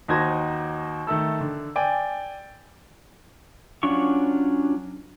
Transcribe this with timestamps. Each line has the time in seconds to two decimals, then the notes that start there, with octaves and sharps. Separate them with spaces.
0.08 D#2 D#4 F#4 C5 G#6 A#6
1.07 D#3 A3 A4 E6
1.41 D3
1.76 D5 G5 G#5
3.83 F#3 C#4 D4 F4 C#6